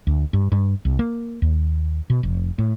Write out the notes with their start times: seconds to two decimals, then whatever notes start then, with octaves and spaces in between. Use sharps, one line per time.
0.07 D2
0.33 G2
0.52 G2
0.85 C2
0.99 A#3
1.42 D#2
2.10 B2
2.23 F1
2.58 A2